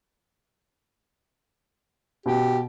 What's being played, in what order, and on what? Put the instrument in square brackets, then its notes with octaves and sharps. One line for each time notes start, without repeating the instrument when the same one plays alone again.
[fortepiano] B2 [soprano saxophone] G4